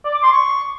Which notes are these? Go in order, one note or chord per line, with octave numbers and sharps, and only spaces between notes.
D5
D6
C6
C#6